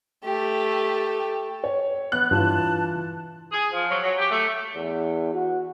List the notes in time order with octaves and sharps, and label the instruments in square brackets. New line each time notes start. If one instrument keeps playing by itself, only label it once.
[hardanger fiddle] A3 G4
[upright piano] C#5
[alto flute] B3 [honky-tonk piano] F#6
[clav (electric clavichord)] G2 [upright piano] E3 F4 [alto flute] A5
[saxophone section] G#4
F3
F#3
F#3
G4
A3
[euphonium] E2
F#4